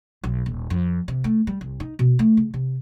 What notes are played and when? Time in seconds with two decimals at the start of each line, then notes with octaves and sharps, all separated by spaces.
0.24 B1
0.46 D#1
0.70 F2
1.08 C3
1.24 A3
1.47 G3
1.61 C2
1.80 D#4
1.99 B2
2.19 A3
2.37 C#3
2.54 C3